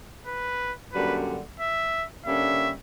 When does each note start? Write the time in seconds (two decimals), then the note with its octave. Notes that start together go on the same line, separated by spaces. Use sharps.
0.27 B4
0.92 F#2 D3 G3 A#3 D4 B4
1.60 E5
2.25 D3 G3 A#3 C#4 E5